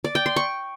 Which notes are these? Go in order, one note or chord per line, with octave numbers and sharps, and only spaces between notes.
D5
G5
C6
C#6